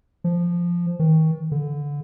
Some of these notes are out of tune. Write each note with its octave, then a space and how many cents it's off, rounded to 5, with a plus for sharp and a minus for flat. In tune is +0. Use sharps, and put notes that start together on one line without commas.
F3 -5
D#3 +35
D3 -20